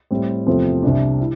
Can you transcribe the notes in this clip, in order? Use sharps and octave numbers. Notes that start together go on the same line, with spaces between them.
A2 G3 C4
E2 C3 F3 A3 C4
C2 C3 G3 D4
E4